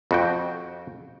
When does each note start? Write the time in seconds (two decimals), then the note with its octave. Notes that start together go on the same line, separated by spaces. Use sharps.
0.11 F2 F#4 G5